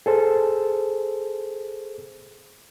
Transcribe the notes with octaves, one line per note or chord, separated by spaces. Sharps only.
G#4 A4 C5